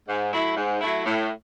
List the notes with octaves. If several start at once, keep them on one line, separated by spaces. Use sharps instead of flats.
G#2
F#3 A3 E4
G#2
F#3 A3 E4
A2